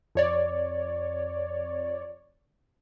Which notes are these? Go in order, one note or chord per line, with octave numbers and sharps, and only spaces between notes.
F2 C#5 D5